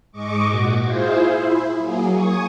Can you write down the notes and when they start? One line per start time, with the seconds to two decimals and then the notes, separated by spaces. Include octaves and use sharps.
0.12 G#2 G#3 D#5 C#6 D6
0.48 A#2 F#4
0.82 E4 F4 G#4 C5
1.28 E4
1.77 F#3 A#3 G#4
2.12 G#5 C#6 D#6